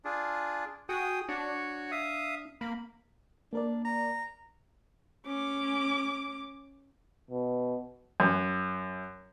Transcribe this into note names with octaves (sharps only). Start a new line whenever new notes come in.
D4 F4 G#4
F#4 G#4 G5 D#6
D4 F#4 C#5
E5 F5 D#6
A#3 B5
A#3 D4 A#4 D5
A#5
C#4 D6
B2
F#2